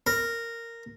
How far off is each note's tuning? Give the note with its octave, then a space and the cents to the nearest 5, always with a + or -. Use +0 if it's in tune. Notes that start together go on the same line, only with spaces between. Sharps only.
A#4 -10